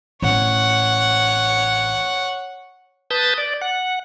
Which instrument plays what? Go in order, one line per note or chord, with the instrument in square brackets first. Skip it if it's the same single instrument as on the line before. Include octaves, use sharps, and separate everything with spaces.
[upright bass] A1 [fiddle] C#5 F#5
[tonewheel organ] B4 A5 D#6 G6 A6
D5
F#5